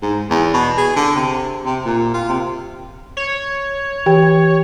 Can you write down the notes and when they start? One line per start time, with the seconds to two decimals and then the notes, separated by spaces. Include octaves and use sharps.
0.02 G#2
0.30 E2
0.54 B2
0.77 G#4
0.96 D3
1.15 C3
1.65 C3
1.85 A#2
2.14 F4
2.29 C3
3.17 C#5
4.06 E3 G4 G5